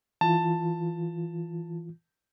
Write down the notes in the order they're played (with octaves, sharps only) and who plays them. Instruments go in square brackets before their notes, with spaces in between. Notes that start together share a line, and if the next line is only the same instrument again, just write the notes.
[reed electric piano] E3 F4 [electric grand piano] A5